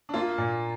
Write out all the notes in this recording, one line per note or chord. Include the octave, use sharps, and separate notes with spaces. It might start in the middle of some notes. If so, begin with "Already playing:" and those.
D4
A#3 F4
A#2